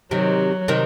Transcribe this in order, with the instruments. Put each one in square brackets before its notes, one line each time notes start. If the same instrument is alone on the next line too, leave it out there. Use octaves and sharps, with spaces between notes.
[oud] C3 D#3 [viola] F#3
[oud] C3 D#3